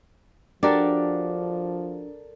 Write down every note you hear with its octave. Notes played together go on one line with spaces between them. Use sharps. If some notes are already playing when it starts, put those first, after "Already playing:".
F3 D4 F#4 G4 A4 A#4 D5